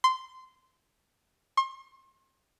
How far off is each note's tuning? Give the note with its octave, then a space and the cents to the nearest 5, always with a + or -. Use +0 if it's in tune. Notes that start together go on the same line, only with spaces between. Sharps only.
C6 -15
C6 +40